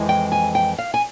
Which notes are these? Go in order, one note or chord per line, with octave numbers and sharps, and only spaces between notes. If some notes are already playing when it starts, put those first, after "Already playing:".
Already playing: F2 E3 G#3
G5
G#5
G5
F5
G#5